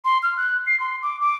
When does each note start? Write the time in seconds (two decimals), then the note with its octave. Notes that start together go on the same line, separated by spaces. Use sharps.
0.05 C6
0.23 F6
0.37 F#6
0.67 C7
0.80 C6
1.02 D6
1.21 D6